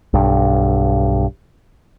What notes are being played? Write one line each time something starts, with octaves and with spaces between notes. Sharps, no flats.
B1 G2